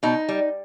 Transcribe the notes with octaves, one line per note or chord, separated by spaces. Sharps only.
B2 D#4
G3